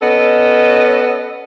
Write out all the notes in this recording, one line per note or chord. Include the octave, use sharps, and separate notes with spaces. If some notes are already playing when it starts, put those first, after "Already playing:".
B3 C#4 A4 D#5